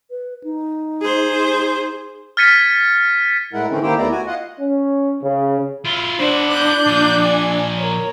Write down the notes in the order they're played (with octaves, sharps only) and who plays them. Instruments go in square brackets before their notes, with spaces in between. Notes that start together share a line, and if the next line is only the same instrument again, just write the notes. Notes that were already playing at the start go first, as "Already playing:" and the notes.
[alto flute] B4
D#4
[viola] G#4 C5
[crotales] F6 G#6 A6 B6 C#7 D#7
[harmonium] A2 G#3 E4 A#4 F#5
D3 E3 C4 C#4
D#3 A#3 E4 G4 C5 G5
D#2 A3 B3 E4 D5 A#5
F#4 G#5
F4 D#5 F#5
[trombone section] C#4
C#3
[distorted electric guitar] E4 F4
[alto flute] D4 [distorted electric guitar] E4 F#4 [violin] C5
[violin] F#6 G6
[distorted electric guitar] A#2 F3
[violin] D5 G#5
A#4 C#5